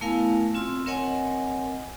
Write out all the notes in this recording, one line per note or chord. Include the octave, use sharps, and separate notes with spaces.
A3 B3 E4 A#4 F5 G#5
C4 F4 C6 E6
C4 A#4 C#5 D#5 F#5 G#5